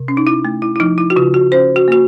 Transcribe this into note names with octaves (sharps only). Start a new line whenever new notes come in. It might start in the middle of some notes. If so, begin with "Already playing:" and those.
Already playing: C3
C#4
D#4
E4
A3
E4
E4
F3 D#4
E4
F#4
C#3 F4
F#4
C#4 C5
F#4
A#3 F#4